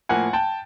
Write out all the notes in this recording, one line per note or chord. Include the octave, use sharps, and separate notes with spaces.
A2 F3 A#3 F#5 G#5
G5 A5